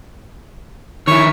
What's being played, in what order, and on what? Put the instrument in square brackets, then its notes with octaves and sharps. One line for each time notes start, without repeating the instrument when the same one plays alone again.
[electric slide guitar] D#3 E4 [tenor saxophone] C#5